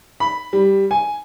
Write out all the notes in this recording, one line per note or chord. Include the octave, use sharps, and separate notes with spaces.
B5
G3
G#5